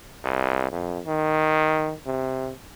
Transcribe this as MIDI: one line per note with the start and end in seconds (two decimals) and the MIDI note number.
0.24 0.71 36
0.72 1.01 41
1.07 1.94 51
2.06 2.51 48